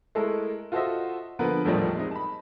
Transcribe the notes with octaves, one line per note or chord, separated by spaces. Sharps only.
G#3 A3 E4 A4 A#4
F4 F#4 A4 C5 D#5 E5
D3 F3 A#3 B3 A#4 B4
E2 A2 D#3 F3 G3 D#4
G#3 C4 D#4
A5 B5